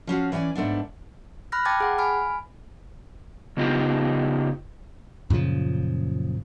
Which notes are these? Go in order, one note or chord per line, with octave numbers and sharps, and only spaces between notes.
F3 C#4 F4 F#4
E3 C#4 D5 G5 G#5
G#2 A3 B3 D4
B5 F6 F#6 A#6
G5 A5 D6 G#6 A6
G#4 F#5
G#5 B5 F6
C#3 B3 D#4 F4 G4
F#2 A#2 C#3 F3